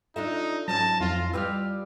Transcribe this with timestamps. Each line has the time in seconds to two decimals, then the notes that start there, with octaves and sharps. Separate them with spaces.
0.16 D4 D#4 F4 A4 E5
0.68 G#2 F#3 C#4 A5 A#6
1.01 F2 E4 F4 A#6
1.34 G3 F4 G4 B4 E6 F6